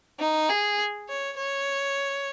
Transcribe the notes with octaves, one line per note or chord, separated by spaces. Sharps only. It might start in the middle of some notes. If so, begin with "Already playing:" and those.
D#4
G#4
C#5
C#5